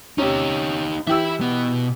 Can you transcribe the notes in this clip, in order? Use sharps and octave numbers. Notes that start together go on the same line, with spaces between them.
C3 C#4 D#4 G4
E3 E4 G4 E5 E6
B2 B3